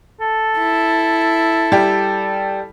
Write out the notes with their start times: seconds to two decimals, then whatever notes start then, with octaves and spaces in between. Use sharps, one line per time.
0.20 A4
0.59 E4
1.72 G3 G5